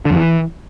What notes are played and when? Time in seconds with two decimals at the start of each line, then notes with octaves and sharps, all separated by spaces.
0.05 D3
0.11 F2
0.16 E3